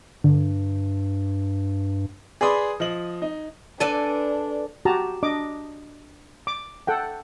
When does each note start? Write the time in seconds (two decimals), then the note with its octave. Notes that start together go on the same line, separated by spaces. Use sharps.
0.24 G2 D3
2.41 G#4 B4 D5 B5 C6 D#6
2.80 F3 D#5 F#7
3.22 D#4
3.80 D4 A4 B4 D5 G#5
4.85 F#4 G4 A5 A#5
5.23 D4 D#5 D6
6.47 D6
6.87 A4 F#5 G5